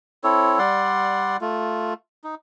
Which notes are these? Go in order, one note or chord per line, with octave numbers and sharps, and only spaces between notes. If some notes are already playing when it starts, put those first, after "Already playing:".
C4 E4 A4 C#5
G3 D5 F#5 C6
A3 F4
D#4